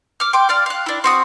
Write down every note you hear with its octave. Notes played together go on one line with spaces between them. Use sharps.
D6 F6
G5 C6 D6
D5 F5 F6
F5 F#6
D4 E4
C4 F#4 D#6